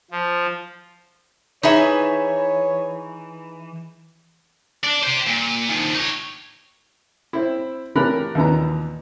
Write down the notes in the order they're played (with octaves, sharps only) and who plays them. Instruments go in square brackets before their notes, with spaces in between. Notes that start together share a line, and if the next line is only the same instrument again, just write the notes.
[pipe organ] F3
[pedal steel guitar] E3 [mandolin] D#4 G#4 [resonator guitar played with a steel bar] B4 E5 [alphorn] C#5
[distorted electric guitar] D4 D5
G4 C5
A#2
D#3 F3
D#4 C#5
[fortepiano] C4 E4
E3 A3 G4 A#4 B5 F#6
D#2 A#2 E3 B3 A#5